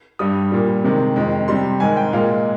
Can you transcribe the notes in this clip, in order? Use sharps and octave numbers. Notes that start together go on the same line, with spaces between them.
G2 G3 D#6
A#2 G3
C3 D#3 G#3
F2 D#3 G#3
C3 G3 C6
G#2 D#3 G#3 G#5
G5
A#2 G#3 F5